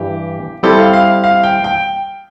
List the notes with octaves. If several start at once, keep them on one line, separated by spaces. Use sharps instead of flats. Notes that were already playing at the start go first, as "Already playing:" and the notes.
Already playing: G2 E3 G4
G3 C4 E4 A4
F5
F5
F5
G5
G5